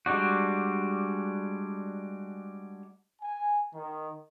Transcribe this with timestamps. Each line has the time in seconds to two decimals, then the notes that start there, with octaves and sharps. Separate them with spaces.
0.06 G3 G#3 D4 F#4
3.22 G#5
3.74 D#3